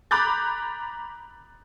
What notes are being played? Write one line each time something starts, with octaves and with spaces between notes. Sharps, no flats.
A#5 B5 D6 F#6 G6 A6